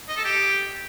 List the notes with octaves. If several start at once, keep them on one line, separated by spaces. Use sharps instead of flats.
D#5
A4
G4